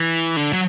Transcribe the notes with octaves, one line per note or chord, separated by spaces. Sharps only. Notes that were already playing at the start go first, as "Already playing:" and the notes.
Already playing: E3
D3
F#3